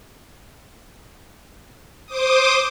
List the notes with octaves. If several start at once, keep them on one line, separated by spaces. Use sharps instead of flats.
C5 D6 D#6